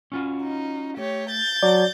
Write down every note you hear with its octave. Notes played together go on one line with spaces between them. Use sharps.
C#4 F4 F#4
D#4
A3 G4 C#5
G6 A6
F#3 D4 D5